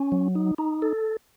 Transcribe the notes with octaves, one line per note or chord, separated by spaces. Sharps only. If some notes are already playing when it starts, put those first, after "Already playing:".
Already playing: C#4
F#3
D#4
D#4
A4